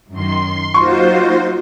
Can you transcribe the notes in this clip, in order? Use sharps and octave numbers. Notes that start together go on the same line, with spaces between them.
F#2 D#3 C6
F#3 A#3 D#4 F4 F#4 C5 C6 C#6